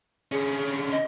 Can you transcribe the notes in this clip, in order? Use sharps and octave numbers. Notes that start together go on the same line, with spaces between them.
D3 C#4 G#4
D#5